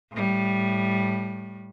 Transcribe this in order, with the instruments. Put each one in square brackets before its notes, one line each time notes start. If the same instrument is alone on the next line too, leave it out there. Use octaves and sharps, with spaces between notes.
[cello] A2 G3